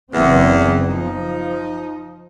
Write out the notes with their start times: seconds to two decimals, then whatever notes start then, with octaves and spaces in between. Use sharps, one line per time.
0.12 F#1 E2 B3 C4
0.88 F3 D#4